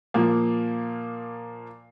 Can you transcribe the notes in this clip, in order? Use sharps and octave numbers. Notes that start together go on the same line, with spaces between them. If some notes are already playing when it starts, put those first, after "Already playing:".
A#2 F3 A#3